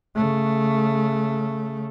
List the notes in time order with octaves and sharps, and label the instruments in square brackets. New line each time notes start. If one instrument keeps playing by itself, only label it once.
[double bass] C#3 A3